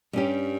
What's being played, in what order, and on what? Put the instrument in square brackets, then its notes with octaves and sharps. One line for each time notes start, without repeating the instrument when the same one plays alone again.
[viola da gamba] G2 [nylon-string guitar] G3 C#4 G4